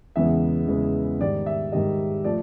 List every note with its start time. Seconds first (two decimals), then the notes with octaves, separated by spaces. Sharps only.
0.16 E2 C#3 E3 G#3 B3 E5
0.68 E2 C#3 E3 G#3 B3
1.20 G#2 D#3 G3 D5
1.46 E5
1.72 G#2 D#3 G3 D#5
2.24 F3 A3 D5